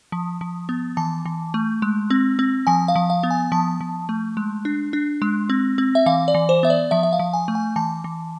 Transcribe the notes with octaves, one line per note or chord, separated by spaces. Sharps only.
F3
F3
B3
E3 A5
E3
A3
G#3
C4
C4
F3 G#5
F5
F3
F5
B3
G#5
F3 A5
F3
A3
G#3
D4
D4
G#3
C4
C4
E5
E3 F5
D5
E3
C5
B3 E5
D5
F3 E5
E5
F5
F3
G#5
A3
G#5
E3 A5
E3